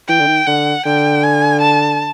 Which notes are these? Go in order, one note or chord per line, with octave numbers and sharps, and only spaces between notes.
E3 G5
D3
D#3
D3 F#5
D3 G5
G#5
A5